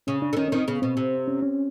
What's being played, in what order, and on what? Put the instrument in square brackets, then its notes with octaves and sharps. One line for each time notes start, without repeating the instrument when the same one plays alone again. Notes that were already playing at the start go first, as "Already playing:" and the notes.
[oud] C#3 [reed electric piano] C#4
[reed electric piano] D4
[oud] D3
[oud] D#3 [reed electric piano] C#4
[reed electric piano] C#4
[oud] D#3 [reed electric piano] C4
[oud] C#3 [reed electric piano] B3
[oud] B2 [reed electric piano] C4
[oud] C3
[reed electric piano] C#4
C#4